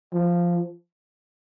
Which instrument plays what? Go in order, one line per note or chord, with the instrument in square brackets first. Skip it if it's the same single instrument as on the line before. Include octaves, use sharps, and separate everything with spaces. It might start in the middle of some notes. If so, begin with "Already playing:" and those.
[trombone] F3